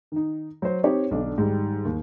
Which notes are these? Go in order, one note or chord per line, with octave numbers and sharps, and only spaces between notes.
D#3 D#4
F#3 C5
C4 D#4 G4 C#5
B1 D3 D4
G#2 D#3 G3
D#2